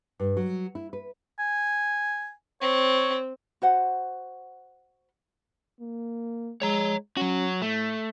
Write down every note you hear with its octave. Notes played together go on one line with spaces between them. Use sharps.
G2
F#3
E4
B4
G#5
C4 C#5
F#4 C5 F#5
A#3
G#3 C#5 A#5
F#3 C#4 F#4
A2 A3